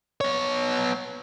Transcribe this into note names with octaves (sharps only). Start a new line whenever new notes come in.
B3 C#5